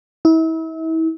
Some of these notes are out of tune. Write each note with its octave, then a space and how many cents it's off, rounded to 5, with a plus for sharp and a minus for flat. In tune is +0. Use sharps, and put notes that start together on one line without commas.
E4 -35